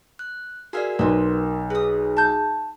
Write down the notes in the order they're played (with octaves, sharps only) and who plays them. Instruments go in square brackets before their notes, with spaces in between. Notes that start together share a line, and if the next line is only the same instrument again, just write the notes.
[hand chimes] F#6
[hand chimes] F#4 A#4 D5 [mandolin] G#4 E5 F5
[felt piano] B1 [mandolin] C4 B4 [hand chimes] A#4
[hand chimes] G#4 [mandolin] B4 D#6
[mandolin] A5 G6